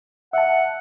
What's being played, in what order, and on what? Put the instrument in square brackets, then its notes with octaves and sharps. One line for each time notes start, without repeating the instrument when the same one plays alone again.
[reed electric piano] E5 A5 [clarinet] F#5